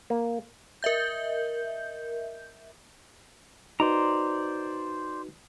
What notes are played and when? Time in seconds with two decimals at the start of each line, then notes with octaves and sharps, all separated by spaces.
0.10 A#3
0.83 A#4 D#5 E5 G6
3.80 D#4 F#4 B4 C5 D5 A#5